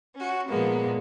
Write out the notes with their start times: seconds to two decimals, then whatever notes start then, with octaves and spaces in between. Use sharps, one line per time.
0.16 C#4 F#4
0.48 A#2 F3 G#3 A#3 B3